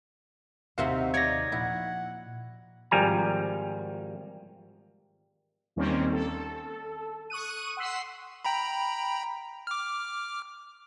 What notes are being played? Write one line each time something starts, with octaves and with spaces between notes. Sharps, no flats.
D#2 C3 C4 D#4 F#4 E5 F5
D#4 C#5 D5 G#6 A#6
A#2 F3 E4 F#5
G#1 F3 G3 G#5 A#5
D#2 D#3 G3 A#3 C4 C#4
A4
C#6 D#6 F#6 D#7
F#5 C6 E6 B6 C7
G5 A#5 B5
D6 F6